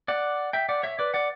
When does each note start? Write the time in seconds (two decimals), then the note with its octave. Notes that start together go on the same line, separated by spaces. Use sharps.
0.08 D5 F#5
0.53 E5 G5
0.69 D5 F#5
0.83 C#5 E5
0.99 B4 D5
1.14 D5 F#5